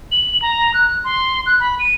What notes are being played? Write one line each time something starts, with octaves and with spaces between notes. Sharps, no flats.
F#7
A#5
F#6
C6
F#6
B5
D#7